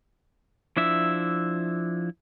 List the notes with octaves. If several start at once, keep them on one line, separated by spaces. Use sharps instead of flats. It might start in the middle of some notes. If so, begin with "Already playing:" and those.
F3 D4 E4 E5